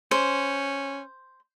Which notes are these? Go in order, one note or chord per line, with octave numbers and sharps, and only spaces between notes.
C#4 C5